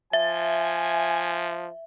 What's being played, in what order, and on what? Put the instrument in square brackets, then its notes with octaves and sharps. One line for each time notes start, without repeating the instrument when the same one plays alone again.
[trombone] F3 [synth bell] E5 [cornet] G#5